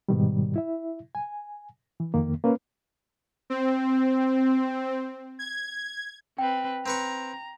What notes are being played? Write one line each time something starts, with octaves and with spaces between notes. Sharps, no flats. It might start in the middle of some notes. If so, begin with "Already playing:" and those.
G#2 B2 D#3 G3
E4 E5
G#5
E3
F2 D#3 A#3
A#3 C#4 B4
C4
G#6
C4 B4 G5
C4 B4 A#5 C#6